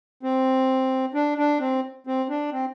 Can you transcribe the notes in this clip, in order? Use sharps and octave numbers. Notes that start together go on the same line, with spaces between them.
C4
D4
D4
C4
C4
D4
C4